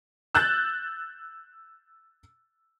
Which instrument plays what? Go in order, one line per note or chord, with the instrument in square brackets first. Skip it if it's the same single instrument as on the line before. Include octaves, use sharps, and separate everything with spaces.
[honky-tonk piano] E6 F#6 G6 A6